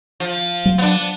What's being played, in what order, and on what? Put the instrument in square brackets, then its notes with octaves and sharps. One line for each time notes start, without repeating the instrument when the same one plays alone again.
[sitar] F3
[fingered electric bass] F#3
[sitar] B3 D4